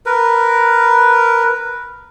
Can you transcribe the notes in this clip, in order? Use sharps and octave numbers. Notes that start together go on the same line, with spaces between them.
A#4 B4